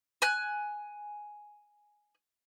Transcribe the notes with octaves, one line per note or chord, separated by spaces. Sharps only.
G#5 F#6